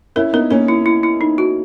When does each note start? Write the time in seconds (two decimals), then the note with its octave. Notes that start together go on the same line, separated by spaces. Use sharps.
0.16 C#4 E4 A#4
0.33 B3 D#4 A#4
0.51 A#3 C#4 A#4
0.68 E4
0.86 E4
1.03 E4
1.21 D#4
1.38 F#4